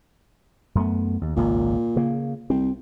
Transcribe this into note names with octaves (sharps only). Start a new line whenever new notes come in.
F#2 A3 B3
D#2
G#1 C#2 A#2
C#3 A#3
C2 C4